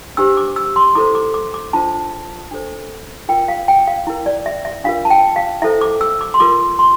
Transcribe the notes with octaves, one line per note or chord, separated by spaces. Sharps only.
D4 G4 C5 E6
D6
E6
C6
E4 A4 C5 D6
D6
D6
D6
D4 F4 C5 A5
D4 A4 C5
F4 A#4 G5
F5
G5
F5
E4 A#4
D5
E5
E5
D4 F4 A#4 F5
A5
G5
F5
E4 A4 C5 E5
D6
E6
D6
C6
F4 A#4 D6
C6